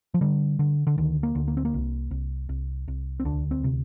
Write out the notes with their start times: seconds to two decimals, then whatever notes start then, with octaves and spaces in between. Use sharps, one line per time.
0.14 F3
0.21 D3 G3
0.59 D3
0.87 D3
0.98 D2 D#3
1.23 A#3
1.35 D2
1.48 A#3
1.57 C4
1.65 A#3
1.74 C2
2.11 C2
2.49 C2
2.88 C2
3.20 C4
3.25 D2 D4
3.51 C4
3.64 C3